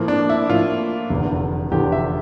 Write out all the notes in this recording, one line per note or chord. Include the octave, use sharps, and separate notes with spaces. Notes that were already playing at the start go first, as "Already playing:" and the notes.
Already playing: A2 F3 A#3
D4
E4
A2 F3 A#3 F4
F1 E2 D3
F1 E2 D3 G4
E5